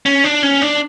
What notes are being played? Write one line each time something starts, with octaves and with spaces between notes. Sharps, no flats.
C#4
D4
C#4
D4